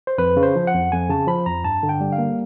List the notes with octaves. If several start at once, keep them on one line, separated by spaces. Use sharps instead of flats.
C5
F2 B4
C#3
C5
F3
F#5
F2
F2 G#5
C#3 A5
F3 B5
F2 A#5
G2 A5
D3
G5
G3
F5
A#3